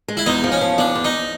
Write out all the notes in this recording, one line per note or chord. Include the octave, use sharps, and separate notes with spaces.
G#3
E4
E2 D#4
F3
C#4
F3
E2 D4
E2
D#4